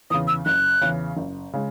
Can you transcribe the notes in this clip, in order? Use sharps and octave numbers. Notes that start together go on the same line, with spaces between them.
E2 C#3 D#6
E6
F#1 F#6
E2 C#3
F#1
C#3 G#3